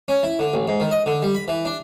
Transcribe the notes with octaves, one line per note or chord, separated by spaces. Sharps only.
C#4
E4
D3
A1
G#2
D#3
D#5
D3
G3
B5
E3
D4